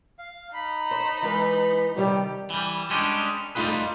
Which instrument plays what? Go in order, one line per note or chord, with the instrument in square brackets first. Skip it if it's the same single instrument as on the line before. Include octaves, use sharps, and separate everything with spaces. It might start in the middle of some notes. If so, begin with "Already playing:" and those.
[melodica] F5
[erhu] D#4 [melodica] B5
[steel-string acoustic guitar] C5
E3 G#3 B4
[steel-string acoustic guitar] C3 D#3 G4 [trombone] G3
[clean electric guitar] E3 G3
G3 G#3 C#4 D4 G4
G3 A3 D#4 F4 G#4 B4